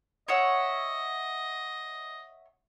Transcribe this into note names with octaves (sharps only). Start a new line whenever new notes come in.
C#5 D#5 E5 F#5